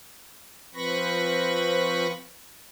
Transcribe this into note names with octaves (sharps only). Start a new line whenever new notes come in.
F3 C4 B4 B5 C#6 A#6